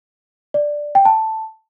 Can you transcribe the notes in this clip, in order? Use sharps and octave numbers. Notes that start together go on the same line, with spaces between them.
D5
G5
A5